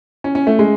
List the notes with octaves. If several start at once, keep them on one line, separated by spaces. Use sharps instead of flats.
C#4
C#4
A3
G#3